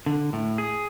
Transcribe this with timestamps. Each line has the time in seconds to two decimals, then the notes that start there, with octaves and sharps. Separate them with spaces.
0.06 D3
0.33 A2
0.58 G#4